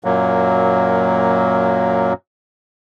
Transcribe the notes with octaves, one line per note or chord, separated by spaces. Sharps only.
F#2 A#2 F#3 A#3